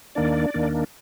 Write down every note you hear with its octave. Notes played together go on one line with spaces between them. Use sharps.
D#2 D#3 A#3 D4 D5
D#2 D#3 A#3 D4